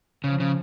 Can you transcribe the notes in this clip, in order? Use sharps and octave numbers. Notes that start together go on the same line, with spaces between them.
C#3 F3
C#3